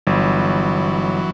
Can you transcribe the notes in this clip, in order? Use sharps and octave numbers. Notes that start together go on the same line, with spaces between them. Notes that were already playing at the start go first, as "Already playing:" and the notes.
G1 E3 F#3